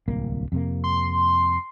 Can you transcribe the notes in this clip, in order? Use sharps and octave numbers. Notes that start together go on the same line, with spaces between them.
D1 C2 A#3
F2 C3 A#3
C6